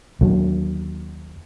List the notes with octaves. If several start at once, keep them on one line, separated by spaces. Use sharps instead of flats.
D#2 D3 F#3 A#3